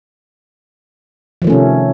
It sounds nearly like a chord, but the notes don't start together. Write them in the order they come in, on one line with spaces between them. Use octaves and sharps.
F3 D#3 A3 C#4 C3